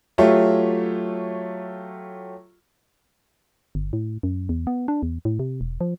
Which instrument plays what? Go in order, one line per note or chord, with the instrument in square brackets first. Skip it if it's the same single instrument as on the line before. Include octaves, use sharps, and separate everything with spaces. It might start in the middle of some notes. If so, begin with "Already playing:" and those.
[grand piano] F#3 A3 F4 G4 C#5
[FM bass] G1
A2
F#2
E2
B3
D4
E2
A2
C3
E1
F3